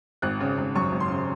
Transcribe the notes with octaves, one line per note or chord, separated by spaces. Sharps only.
G#1 F#6
C#3
G#1
F#2 C#6
G#1
C6
C#3